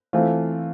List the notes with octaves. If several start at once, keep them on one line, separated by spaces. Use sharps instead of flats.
E3 A3 C4 F4